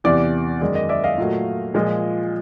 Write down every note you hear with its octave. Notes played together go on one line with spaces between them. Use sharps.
E2 C3 E3 D5
F#2 D#3 G#3 D5
D#5
D5 E5
D#5 F5
A#2 F#3 A3
A#2 F3 G#3